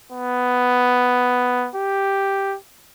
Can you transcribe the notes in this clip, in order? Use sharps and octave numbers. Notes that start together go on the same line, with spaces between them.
B3
G4